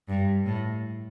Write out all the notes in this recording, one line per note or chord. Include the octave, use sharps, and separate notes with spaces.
G2
A2